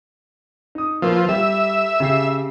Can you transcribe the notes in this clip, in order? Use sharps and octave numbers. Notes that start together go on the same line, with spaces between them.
D#4 D#6
F3 A#3 B4 E6
G3 G4 E5
C#3 G4 C7